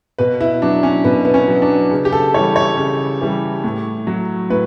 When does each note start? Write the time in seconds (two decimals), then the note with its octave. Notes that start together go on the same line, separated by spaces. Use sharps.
0.18 B2 B4
0.41 E4
0.62 F#3 D4
0.83 C#4
1.04 B2 B3
1.25 B3
1.34 C#4
1.48 F#3
1.62 D4
1.91 C#3
2.05 G4
2.12 A4
2.34 E3 G3 C#5
2.56 C#5
2.77 C#3
3.21 E3 G3
3.64 A2
4.07 F#3
4.50 A2 B4